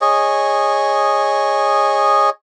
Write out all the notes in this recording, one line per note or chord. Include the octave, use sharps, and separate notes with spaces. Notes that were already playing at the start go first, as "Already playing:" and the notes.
G#4 C#5 D#5